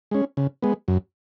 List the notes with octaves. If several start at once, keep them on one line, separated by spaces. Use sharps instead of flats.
G#3 C#4
C#3
G#3 B3
F#2